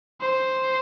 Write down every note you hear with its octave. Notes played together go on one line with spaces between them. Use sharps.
C5